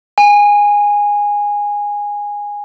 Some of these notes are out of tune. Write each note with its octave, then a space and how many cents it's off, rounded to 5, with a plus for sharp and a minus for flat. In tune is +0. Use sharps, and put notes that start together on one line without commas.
G#5 -15